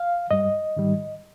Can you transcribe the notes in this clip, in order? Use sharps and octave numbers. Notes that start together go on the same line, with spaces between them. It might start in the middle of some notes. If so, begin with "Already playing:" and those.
Already playing: F5
G2 G3 D#5
G#2 D#3 G3